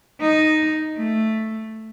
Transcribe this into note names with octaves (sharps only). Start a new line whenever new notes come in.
D#4
A3